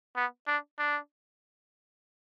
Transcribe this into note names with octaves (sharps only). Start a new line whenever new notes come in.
B3
D4
D4